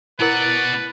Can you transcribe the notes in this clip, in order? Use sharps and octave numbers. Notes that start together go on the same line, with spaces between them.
B2 E4 A#4 B4 D5 F#5